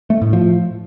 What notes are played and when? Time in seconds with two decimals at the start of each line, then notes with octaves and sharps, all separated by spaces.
0.10 A3
0.22 A2
0.33 F3